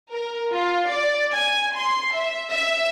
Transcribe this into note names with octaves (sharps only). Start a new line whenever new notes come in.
A#4
F4
D5
G#5
C6
E5
E5